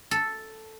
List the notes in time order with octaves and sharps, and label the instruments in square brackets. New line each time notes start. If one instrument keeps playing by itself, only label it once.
[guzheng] A4